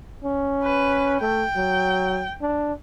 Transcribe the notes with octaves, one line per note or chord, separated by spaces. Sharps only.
C#4
B4
A3 G5
F#3
D4